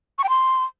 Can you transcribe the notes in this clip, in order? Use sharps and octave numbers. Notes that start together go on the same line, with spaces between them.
C#6
G5
C6